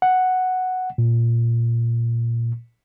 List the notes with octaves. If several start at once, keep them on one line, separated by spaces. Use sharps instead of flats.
F#5
A#2